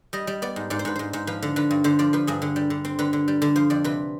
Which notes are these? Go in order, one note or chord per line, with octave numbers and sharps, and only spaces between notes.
G3 D#5
G3
B3 D5
G#2
G#2 D5
C5
G#2 B4
G#2 C5
G#2
F3 B4
D3
D3 B4
G2
D3 C5
F3 D5
F3 B4
G2 G#4
D3
G3
D3
C4
D3 B4
D3
G3
D3
F3 C5
F2 D5
C3 B4